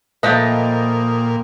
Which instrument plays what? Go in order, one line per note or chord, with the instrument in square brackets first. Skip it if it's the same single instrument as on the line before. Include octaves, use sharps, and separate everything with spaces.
[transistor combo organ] A#2 [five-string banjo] F3 A3 B4 [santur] D#5 G5 A5